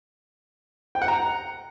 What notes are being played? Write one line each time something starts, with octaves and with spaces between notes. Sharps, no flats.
G5
F#5
A#5